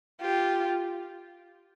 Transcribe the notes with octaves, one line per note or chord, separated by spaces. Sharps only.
F4 G4